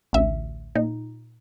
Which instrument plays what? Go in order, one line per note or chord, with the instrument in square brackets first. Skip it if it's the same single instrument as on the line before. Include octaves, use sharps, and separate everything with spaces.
[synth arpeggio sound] A1 D2 E5
A#2 D#4